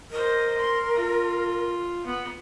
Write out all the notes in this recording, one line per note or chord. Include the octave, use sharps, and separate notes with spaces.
A#4 C5 D#5
C6
F4
B3